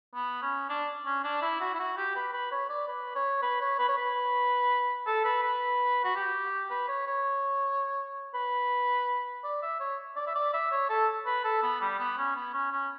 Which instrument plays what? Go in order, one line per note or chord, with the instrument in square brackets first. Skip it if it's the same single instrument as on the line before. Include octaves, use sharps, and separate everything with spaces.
[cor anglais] B3
C#4
D4
C#4
D4
E4
F#4
E4
F#4
G4
B4
B4
C#5
D5
B4
C#5
B4
C#5
B4
C#5
B4
A4
B4
B4
F#4
G4
B4
C#5
C#5
B4
D5
E5
C#5
D5
E5
D5
E5
C#5
A4
B4
A4
B3
G3
B3
C#4
B3
C#4
C#4